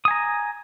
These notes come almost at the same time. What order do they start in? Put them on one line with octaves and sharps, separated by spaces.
D#6 G#5 A#5